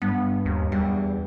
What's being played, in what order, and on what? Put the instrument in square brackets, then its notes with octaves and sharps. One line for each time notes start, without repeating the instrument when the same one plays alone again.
[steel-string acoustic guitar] G2 [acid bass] B3
[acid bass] D#2
[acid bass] E2 [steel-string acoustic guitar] G3